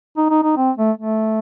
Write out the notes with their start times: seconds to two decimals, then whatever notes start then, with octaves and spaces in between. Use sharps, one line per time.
0.17 D#4
0.30 D#4
0.43 D#4
0.57 C4
0.78 A3
0.98 A3